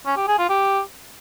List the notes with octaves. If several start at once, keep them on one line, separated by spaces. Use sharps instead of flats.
C#4
G4
G#4
F4
G4